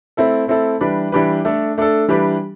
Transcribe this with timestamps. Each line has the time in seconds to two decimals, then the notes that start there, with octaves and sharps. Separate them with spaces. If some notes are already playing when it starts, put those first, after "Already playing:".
0.17 A3 C4 E4 A4
0.48 A3 C4 E4 A4
0.81 E3 G3 D4 G4 B4
1.12 E3 G3 D4 G4 B4
1.45 A3 D4 A4
1.78 A3 D4 A4
2.08 E3 G3 D4 G4 B4